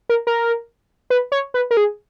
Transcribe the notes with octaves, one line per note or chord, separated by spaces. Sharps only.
A#4
A#4
B4
C#5
B4
A#4
G#4